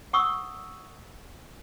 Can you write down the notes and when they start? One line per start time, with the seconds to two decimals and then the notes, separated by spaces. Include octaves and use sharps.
0.13 F#5 C#6 D#6 E6